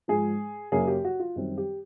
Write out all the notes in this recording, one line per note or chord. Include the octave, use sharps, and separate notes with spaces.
G#2 F3 G#3 G#4
F#2 C#3 F#3 A#3 G#4
G4
F#4
F4
F#2 D#3 G3 C4
G4